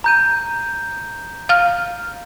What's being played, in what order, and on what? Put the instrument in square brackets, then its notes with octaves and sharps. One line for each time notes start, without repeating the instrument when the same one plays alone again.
[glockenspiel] A#5 G6 D#7
[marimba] F5 F6